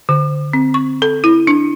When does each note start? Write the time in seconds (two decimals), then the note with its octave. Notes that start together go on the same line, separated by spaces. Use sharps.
0.09 D3
0.53 C4
0.74 C#6
1.02 A4
1.24 E4
1.47 D4